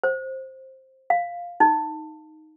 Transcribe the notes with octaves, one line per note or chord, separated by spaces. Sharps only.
C5
F5
D#4